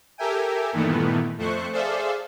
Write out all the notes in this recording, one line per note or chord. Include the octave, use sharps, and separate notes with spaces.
G4 A4 A#4 E5 G5 G#5
G2 A#2 D#3 E3 A3 B3
F2 A3 C5 C#6 F#6 C#7
G#4 A4 C5 D5 E5 F5